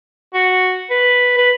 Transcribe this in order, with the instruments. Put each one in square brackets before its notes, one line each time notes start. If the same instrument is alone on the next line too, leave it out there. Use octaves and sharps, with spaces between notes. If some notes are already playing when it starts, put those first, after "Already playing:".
[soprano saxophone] F#4
B4
B4